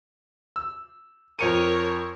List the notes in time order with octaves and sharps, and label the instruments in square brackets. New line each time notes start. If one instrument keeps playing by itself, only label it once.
[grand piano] E6
[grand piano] F2 C#7 D#7 [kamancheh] A#4 C#5